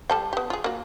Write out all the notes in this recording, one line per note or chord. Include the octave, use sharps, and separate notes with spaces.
G3 A4 G5
B3 G4
F4 G#4
A#3 F#4